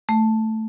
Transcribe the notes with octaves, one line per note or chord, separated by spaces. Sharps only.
A3